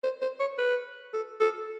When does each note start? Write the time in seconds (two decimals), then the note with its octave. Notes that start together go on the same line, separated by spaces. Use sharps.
0.04 C5
0.22 C5
0.40 C#5
0.58 B4
1.13 A4
1.40 A4